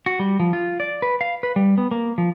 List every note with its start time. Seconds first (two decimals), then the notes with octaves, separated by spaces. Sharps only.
0.06 F#4
0.19 G3
0.40 F3
0.53 F4
0.80 D5
1.02 B4
1.21 F5
1.43 B4
1.56 G3
1.78 B3
1.91 A#3
2.18 F3